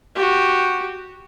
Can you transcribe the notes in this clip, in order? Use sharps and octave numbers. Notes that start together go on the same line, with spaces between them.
F#4 G4